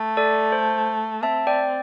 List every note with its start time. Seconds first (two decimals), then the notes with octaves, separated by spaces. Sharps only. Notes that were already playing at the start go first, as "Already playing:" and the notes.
Already playing: A3
0.17 A4 D5
0.52 C5
1.23 C4 E5 A5
1.47 D5 G5